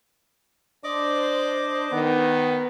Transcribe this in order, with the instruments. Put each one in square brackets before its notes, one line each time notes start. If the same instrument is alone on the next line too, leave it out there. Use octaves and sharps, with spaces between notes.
[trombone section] D4 C5 [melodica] D5 D#5 D6
[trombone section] D#3 [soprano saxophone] B3